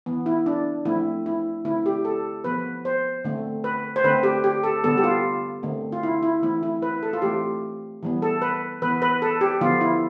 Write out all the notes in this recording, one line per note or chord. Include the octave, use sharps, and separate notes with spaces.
E3 B3
E4
D4
F3 A3 C4 E4
E4
D3 A3 C4 E4
G4
A4
F3 B3 B4
C5
D3 A3 C4
B4
C5
D3 A3 C4 B4
G4
G4
A4
D3 G3 B3 A4
G4
F4
D3 A3 C4
F4
E4
E4
E3 A3 C4 E4
E4
B4
A4
F4
E3 A3 C4 G4
E3 G3 B3
A4
B4
E3 B3 B4
B4
A4
G4
D3 F3 B3 F4
E4